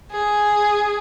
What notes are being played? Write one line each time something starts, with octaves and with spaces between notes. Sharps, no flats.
G#4